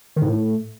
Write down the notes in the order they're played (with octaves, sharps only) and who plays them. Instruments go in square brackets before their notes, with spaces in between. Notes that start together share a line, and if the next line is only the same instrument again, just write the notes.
[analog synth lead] D#3
G#2
A2